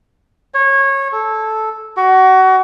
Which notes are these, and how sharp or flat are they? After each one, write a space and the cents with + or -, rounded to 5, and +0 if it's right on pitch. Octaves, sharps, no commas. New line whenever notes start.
C#5 -20
A4 -10
F#4 +25